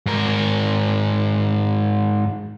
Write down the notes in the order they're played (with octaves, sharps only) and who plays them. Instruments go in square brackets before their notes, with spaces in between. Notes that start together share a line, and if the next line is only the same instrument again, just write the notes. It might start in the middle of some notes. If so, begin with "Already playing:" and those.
[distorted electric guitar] G#2 A#4